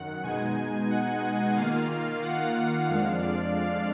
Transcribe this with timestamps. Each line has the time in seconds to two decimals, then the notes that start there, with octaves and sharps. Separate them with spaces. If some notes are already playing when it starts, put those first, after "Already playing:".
Already playing: F#2 D#3 F#5
0.23 B2 G#3 D#4 G#5
0.90 F#5
1.56 D#3 A#3 F4 F5
2.23 F#5
2.89 F2 F3 G#3 D4 F5
3.21 D5
3.55 F5